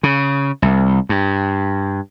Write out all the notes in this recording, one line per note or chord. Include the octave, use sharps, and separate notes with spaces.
C#3
C2
G2